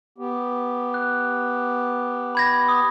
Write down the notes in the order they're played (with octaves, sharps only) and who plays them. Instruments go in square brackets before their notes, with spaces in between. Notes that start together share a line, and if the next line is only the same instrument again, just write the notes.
[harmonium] B3 G4
[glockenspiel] F#6
B5 G#6 A#6
D#6